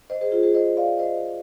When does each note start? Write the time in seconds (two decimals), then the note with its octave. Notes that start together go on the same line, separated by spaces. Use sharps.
0.10 C5 D#5
0.21 G#4 C5
0.32 F4 G#4
0.43 G#4 C5
0.54 C5 D#5
0.77 D5 F5
0.99 C5 D#5